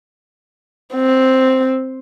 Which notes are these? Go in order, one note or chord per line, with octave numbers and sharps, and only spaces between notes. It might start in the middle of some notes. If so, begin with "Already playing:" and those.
C4